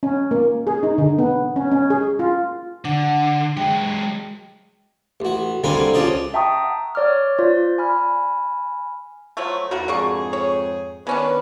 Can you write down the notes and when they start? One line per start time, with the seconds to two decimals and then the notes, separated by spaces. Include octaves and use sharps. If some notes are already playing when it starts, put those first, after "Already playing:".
0.03 C#4
0.31 A#3
0.67 G#4
0.83 D#4
0.98 D3
1.19 B3
1.56 C#4
1.72 C#4
1.90 G#4
2.19 F4
2.85 D3 D4 F#5
3.57 F#3 G#3 G5
5.20 A1 F#4
5.64 C2 D3 A#3 C4 G#5 B5
5.94 C#2 F3 C#4 D5 D#5
6.34 E5 G5 A5 A#5 C#6 D#6
6.64 F#5
6.95 C#5 D5 D6 F6
7.38 F4 C5 D5
7.78 G#5 B5 F6
9.37 F3 F#3 A3
9.71 E2 D3 D#4 F#4 A#4
9.88 F2 G#2 D3 A#3 G#4 C#6
10.33 C#5
11.07 D#3 G#3 B3 C#4 D4 B4